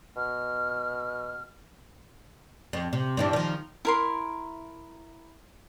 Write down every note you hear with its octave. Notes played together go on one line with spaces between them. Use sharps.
B2 F6
F2
C3
G2 E3 D4
D#3 F3
E4 A#4 C6